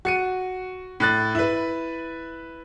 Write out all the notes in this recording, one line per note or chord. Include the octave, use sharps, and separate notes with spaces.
F#4 C#7 D#7
A2 F#6 A6
E4 B4